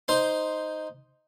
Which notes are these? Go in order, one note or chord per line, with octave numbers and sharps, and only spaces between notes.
D#4 C5 C6